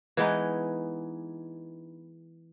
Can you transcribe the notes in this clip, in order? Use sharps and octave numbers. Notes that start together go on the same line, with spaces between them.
E3 G#3 B3 D#4